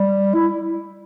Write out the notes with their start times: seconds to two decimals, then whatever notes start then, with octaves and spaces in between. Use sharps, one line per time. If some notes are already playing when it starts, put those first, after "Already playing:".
Already playing: G3
0.34 E4